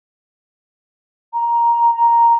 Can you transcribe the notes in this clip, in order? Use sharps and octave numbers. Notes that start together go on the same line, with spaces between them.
A#5
A#5